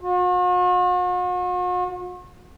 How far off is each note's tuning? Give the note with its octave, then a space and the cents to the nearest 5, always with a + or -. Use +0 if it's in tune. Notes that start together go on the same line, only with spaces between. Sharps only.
F#4 -45